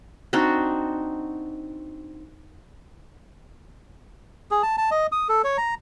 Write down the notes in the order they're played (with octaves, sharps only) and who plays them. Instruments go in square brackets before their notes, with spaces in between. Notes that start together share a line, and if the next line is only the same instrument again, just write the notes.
[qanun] C4 D4 D#4 F#4
[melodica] G#4
A5
A5
D#5
D#6
A4
C#5
A#5